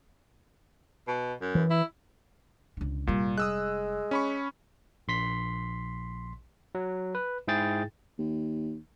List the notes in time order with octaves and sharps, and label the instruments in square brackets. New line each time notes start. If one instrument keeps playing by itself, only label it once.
[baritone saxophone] B2
F#2
[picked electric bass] E3
[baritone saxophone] E4
[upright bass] C#2 D3
[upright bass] F1 G3 [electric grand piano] A#2
[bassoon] G#3 [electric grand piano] D#6 E6 F#6
[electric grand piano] C#4 B5 C#6
[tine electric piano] A#1 C6 B6
F#3
B4
G#2 E4 G#4 G5 A6
[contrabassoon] D#2